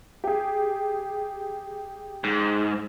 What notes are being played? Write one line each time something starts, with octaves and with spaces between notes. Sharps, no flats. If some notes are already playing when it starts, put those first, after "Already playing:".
G4 G#4
G#2